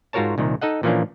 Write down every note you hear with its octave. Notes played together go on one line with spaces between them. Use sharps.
G#2 F4 F#4 A#4 C#5 A5
C2 A#2 D#3
D#4 A4 D#5 F#5
A#2 E3 F3 A#3 C#4 D4